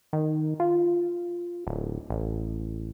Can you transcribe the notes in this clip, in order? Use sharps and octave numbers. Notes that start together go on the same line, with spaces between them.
D#3
F4
D1
A1